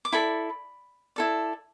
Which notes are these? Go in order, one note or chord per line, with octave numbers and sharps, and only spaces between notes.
D6
E4 A4 D5 B5
E4 A4 D5